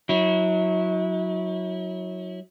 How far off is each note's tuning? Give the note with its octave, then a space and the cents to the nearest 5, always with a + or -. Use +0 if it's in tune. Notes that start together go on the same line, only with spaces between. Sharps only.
F#3 -10 E4 -35